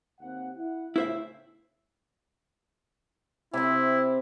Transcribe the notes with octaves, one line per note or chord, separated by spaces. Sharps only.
D#2 C4 F#5
E4 F#5
A2 C#3 E4 C5 E5
C3 C4 E4